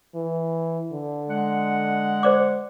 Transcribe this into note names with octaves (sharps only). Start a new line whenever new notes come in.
E3
D3
G#3 F#5
C5 D5 D6